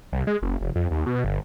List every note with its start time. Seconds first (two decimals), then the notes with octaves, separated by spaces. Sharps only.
0.13 C2
0.27 G#3
0.42 F#1
0.61 F1
0.75 F2
0.91 D#2
1.06 B2
1.24 G1